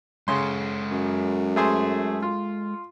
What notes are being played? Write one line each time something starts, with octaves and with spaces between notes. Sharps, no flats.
C#3 G#3 A4 F#5 C6
F#2
A3 G#4 C5
F4